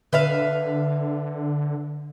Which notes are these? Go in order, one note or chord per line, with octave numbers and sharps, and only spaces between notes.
D3 B4 E5 F5